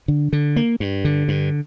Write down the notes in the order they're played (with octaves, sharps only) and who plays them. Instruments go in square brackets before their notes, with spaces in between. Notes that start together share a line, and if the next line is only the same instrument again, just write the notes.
[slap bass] D3
D3
A#3
G2
D3
G2